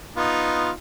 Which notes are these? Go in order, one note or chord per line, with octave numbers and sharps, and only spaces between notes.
B3 D#4 F4